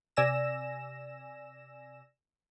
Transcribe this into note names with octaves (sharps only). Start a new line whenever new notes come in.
C3 D5 G#5 E6 A#6 E7